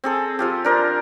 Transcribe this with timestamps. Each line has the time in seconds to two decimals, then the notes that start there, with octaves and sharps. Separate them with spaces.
0.04 C4 G#4 A4
0.39 F3 F4 G4
0.64 D4 A#4 C5